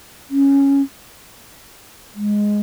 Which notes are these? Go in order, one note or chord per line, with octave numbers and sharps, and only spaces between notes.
C#4
G#3